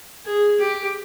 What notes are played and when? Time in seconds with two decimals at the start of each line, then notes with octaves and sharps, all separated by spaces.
0.26 G#4
0.60 G4